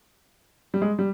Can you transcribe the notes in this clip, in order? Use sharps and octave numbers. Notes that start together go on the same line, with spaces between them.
G3
G#3
G3